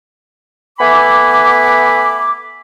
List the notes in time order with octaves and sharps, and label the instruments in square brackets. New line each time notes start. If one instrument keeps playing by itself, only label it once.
[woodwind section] A3 B3 E5 G#5 B5 D6